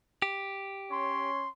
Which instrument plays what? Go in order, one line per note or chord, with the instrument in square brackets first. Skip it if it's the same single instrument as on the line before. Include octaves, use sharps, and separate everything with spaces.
[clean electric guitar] G4
[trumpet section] C#4 C#5 C6